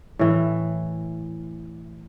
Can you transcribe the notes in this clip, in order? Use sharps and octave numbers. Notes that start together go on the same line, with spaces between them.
A2 E3